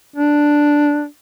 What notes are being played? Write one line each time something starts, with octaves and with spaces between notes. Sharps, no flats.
D4